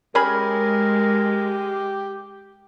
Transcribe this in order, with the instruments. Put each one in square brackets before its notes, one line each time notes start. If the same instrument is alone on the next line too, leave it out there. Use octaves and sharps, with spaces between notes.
[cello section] G#3 [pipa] C#4 G#4 B5 [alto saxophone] G4 [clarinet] A#4